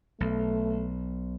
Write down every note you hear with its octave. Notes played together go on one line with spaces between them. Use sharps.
B1 A3